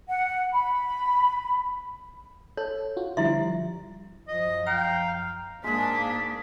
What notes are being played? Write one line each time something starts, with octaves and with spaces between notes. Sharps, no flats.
F#5
B5
A4 C#5
F4 F#4
D3 F3 G3 E4 E5
F#2 F3 D#5
F5 G5 A#5
G#2 G#3 A#3 D4 G#4 B6